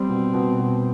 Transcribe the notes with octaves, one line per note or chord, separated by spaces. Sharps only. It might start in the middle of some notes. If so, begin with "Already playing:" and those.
Already playing: G3 C4
B2
B2
B2